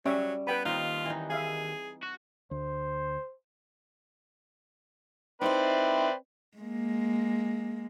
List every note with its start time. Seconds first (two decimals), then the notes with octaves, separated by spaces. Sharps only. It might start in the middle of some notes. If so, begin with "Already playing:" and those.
0.06 F#3 G3 C#4 E5 C#6
0.47 B3 B4 G5 B5
0.65 D#2 C4 D#4 F4
1.05 E3 D#4
1.30 G#4 E5 F5 G#5
2.03 F#4
2.51 D2 C5
5.41 C4 D#4 E4 B4 C5 D5
6.57 G#3 A#3